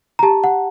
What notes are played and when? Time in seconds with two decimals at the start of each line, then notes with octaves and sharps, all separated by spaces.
0.19 A#5
0.23 G4 A5
0.44 F#5